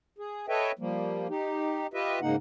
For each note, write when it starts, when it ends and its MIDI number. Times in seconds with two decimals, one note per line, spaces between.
0.18 0.46 68
0.48 0.72 69
0.48 0.72 71
0.48 0.72 73
0.48 0.72 75
0.48 0.72 76
0.48 0.72 79
0.79 1.28 53
0.79 1.28 55
0.79 1.28 58
1.29 1.87 63
1.29 1.87 67
1.94 2.20 65
1.94 2.20 67
1.94 2.20 71
1.94 2.20 75
1.94 2.20 76
2.22 2.36 44
2.22 2.36 49
2.22 2.36 58
2.22 2.36 63
2.22 2.36 78